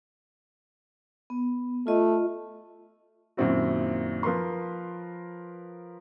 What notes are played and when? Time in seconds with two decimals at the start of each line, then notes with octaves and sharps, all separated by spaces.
1.30 B3
1.87 A3 F4 D#5
3.37 F#2 A#2 D#3 C4 E4 F#4
4.23 F3 A#4 B4 C6